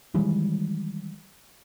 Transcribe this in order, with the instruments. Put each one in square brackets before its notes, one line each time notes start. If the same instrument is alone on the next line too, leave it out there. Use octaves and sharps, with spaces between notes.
[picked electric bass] D#3 E3 G3 G#3